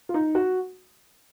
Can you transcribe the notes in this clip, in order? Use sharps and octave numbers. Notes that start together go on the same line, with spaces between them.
F4
D#4
F#4